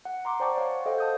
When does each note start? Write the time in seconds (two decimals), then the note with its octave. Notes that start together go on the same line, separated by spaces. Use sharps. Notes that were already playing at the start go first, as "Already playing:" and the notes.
0.05 F#5
0.25 A#5 C6 D6
0.40 C5 D5 G5 A5 C#6 D6
0.58 C#5 F5 F#5
0.86 A4 C5 D#5 F5 G5
0.98 A5 D#6 G6